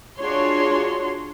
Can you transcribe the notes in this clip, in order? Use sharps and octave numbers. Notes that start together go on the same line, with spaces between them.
D4 F4 F#4 G#4 C#5 C6